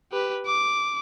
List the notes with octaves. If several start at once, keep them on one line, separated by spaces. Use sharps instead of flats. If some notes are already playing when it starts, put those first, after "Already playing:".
G4 B4
D6